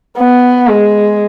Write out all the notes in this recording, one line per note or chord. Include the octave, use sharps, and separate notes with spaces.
B3
G#3